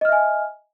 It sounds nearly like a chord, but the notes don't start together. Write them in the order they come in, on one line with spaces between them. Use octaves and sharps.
D#5 F6 E5 G#5